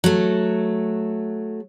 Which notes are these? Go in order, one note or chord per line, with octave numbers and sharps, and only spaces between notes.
F#3 A3